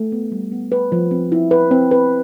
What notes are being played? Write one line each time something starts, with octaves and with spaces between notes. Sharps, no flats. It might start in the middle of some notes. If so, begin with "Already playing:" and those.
Already playing: A3
B3
G3
B3
B4
F3
C4
E4
B4
C4
B4